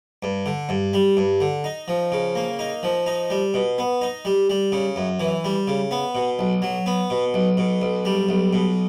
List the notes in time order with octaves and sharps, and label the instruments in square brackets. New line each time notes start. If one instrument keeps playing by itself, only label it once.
[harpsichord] G2
D3
G2
G3
G2
D3
D#4
F3
C#3
A#3
D#4
F3
D#4
G3
B2
B3
D#4
G3
G3
C#3
F#2
E3
G3
C#3
B3
B2
B1
F#3
B3
B2
B1
B2
B1
G3
B1
B2